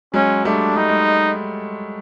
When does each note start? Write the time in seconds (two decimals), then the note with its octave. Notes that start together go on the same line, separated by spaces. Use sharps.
0.14 F#3 G#3 C#4
0.45 G3 A3 D4
0.76 G3 D#4
0.89 G#3